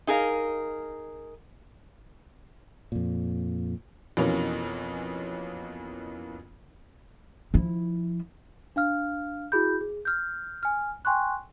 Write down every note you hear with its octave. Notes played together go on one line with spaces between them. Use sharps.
D#4 G#4 A#4 F5
F2 A#2
F2 B2 E3 A#3 C#4
F3 E4
D4 F5 F6
E4 F#4 G#4 B5 G6
G#4
F6 G6
G#5 F6
G5 G#5 C6 C#6 F#6